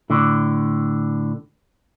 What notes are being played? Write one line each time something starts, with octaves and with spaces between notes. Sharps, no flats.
A2 D3